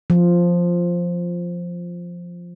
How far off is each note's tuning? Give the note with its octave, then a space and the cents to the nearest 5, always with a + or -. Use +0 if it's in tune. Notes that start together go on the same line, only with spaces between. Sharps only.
F3 +0